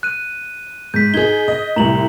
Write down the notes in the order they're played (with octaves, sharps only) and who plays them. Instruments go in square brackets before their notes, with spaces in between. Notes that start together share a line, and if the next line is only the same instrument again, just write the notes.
[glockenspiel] F#6 D#7
[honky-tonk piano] G#2 [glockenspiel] G6 B6
[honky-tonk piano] D#4 G#4 [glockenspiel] G#6 G7
[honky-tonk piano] D#5
[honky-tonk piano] C2 A2 [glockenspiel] A#5 F#7